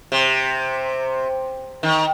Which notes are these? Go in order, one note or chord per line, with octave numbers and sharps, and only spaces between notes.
C3
D#3